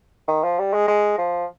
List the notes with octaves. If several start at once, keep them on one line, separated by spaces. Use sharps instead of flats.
D#3
F3
G3
G#3
G#3
F3